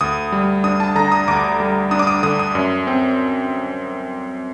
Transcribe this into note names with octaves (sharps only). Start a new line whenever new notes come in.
D2 D#6
G3
D4 D#6
A5
D3 A#5
D#6
D2 D6
G3
D4 D#6
D6
D#6
D3 D#6
D#6
F#2
C4